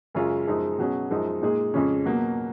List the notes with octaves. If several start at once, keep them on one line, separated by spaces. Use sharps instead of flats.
F#2 C#3 G#3 C#4 F4
F#2 F3 G#3 D#4
B2 F#3 C#4 G#4
F#2 F3 G#3 D#4
A#2 G#3 D#4 G#4
F2 C#3 G#3 C#4
B2 F#3 A#3